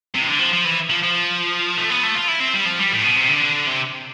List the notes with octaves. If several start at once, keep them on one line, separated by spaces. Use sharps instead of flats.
C3
E3
D3
F3
F3
E3
F3
F3
A3
B3
A3
F4
E4
C4
G3
F3
G3
A2
B2
C3
D3
C3